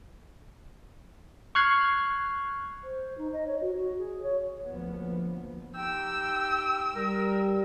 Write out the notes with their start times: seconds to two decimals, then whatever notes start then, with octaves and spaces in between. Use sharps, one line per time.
1.55 C#6 F6 F#6 G#6 C7
2.83 C5
3.17 D#4
3.32 D#5
3.47 C#5
3.61 F#4
3.76 F#4
3.98 G#4
4.22 C#5
4.66 D2 F3 A#3 B3
5.75 D#4 G4 G5 E6
6.95 G3 A#4